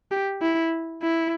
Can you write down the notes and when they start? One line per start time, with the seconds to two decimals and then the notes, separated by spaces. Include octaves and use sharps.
0.11 G4
0.42 E4
1.02 E4